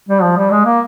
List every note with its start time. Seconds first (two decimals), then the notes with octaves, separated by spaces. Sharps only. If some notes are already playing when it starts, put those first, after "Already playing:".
0.09 G3
0.22 F3
0.37 G3
0.51 G#3
0.65 A#3